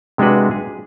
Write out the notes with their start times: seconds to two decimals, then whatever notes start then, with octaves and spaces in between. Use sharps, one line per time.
0.18 C3 G#3 D4 F#4 B4
0.51 G#4